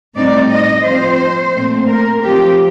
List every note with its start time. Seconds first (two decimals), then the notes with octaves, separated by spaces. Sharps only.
0.15 A2 G3 C4 D#4 D5
0.50 D#5
0.85 F3 C4 F4 C5
1.54 A#2 A3 C4
1.88 A#4
2.22 F3 C4 F4 G4